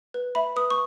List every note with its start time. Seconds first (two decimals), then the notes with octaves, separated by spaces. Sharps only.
0.14 B4
0.35 E5 B5
0.56 B4 D#6
0.70 C#6